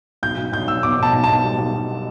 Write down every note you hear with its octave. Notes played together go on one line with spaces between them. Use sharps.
B1 G6
B1
B1 G6
B1 E6
B2 D6
B2 A5
B1
B2 A5
G3
B1
B1